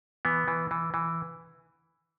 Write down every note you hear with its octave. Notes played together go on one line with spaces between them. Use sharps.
E3 B3
E3
E3
E3